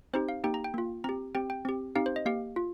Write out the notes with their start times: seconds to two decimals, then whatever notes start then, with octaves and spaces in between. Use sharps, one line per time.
0.13 C4 D#4 G4 C5
0.29 F5
0.44 A#3 D#4 G4 G5
0.54 A#5
0.64 G5
0.74 A#3 F4
1.04 C4 G4 A#5
1.35 C4 G4 G5
1.50 G5
1.65 C4 G4
1.96 C4 D#4 G4 F5
2.06 C5
2.16 D#5
2.26 A#3 G4 F5
2.56 F4